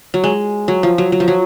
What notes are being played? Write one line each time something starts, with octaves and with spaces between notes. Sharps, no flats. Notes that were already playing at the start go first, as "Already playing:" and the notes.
F#3
G#3
F#3
F3
F#3
F#3
F3
F#3